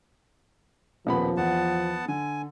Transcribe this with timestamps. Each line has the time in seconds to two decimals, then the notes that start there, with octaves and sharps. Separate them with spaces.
1.07 D#1 F3 B3 B5
1.37 E2 B3 F#5 A5
2.08 D3 G#5